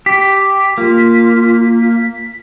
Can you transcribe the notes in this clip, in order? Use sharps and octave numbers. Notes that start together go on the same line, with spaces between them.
G4 B6
A#3 F4